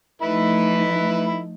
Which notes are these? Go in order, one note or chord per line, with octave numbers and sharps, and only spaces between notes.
F3 A3 D#4 E4 B4